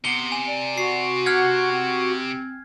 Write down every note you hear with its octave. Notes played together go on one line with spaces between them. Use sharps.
C3 B3 G7
G#5
D5
F#4 C7
F#5 F6 G#6
C4